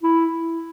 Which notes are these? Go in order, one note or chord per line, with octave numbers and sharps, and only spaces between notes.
E4